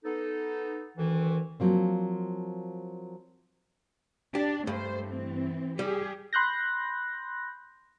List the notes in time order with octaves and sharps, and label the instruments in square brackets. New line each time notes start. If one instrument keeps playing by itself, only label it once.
[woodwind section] B3 D#4 A4
D2 D#3 E3
[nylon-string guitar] F3 F#3 A#3 C4
[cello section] D4 [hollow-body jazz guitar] G4
[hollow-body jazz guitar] G2 [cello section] A3 C5
[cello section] E3 C4
[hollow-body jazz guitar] G3 [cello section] G4 G#4
[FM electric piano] B5 C6 F#6 G6 A#6